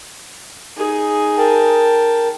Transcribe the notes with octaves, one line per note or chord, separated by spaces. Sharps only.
D#4 G#4
A#4 G5 A5